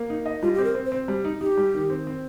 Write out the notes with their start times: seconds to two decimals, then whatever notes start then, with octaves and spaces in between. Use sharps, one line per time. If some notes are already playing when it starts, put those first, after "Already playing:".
Already playing: A#3
0.10 D#4
0.26 D#5
0.42 G3 F4
0.54 C4 G4
0.64 A#4
0.75 C4
0.86 C5
0.92 C4
1.08 G3
1.25 D#4
1.41 D#4 G4
1.57 G3
1.74 D#3
1.90 C4
2.07 C4